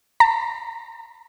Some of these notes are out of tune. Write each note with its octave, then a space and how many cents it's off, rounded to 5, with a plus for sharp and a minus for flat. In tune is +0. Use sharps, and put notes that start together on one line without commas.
A#5 -40